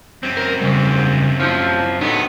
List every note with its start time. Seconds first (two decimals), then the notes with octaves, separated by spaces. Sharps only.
0.23 F#2 C4
0.37 A#4
0.62 G#2 C#3 G3
1.40 F3 C#4 E4
2.01 C3 D#3 F#3 B3 D4 A4 D#5